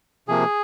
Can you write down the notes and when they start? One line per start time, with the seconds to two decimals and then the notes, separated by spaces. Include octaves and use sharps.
0.28 C3 F3 A#3 G#4